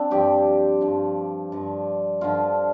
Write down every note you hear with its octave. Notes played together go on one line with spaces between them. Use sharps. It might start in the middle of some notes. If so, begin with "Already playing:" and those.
Already playing: C4 D4
G2 F3 G4
G2 F3
G2 F3
G2 D3 F3 F4